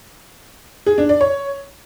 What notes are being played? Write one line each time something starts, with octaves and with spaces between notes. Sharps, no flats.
G#4
D4
D5
C#5